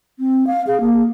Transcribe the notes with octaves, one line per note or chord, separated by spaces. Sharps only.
C4
F5
G#4
A#3